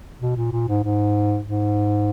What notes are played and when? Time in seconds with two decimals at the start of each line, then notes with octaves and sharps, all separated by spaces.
0.21 B2
0.36 A#2
0.52 A#2
0.68 G#2
0.84 G#2
1.46 G#2